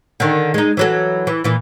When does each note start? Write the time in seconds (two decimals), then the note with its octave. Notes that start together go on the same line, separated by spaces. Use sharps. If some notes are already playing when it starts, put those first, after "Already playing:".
0.20 D3 D#3
0.54 G#3 D#4
0.77 E3 F#3 A4
1.27 E3
1.44 A#2 E3